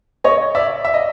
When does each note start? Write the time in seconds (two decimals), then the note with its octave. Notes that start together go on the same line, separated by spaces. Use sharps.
0.24 C#5 D#5
0.55 D5 E5
0.85 E5
0.94 D#5